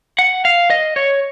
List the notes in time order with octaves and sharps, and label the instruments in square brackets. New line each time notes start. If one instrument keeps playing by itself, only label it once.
[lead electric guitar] F#5
F5
D#5
C#5